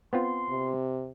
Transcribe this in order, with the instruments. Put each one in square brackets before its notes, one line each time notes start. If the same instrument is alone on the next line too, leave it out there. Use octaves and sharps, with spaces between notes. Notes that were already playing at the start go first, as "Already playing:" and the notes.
[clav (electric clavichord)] B3 C4 F4 [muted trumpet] C6
[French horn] C3